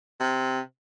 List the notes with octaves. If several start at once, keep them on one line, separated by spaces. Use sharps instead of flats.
C3